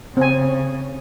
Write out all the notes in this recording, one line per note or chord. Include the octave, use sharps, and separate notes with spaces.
C#3 C4 G#5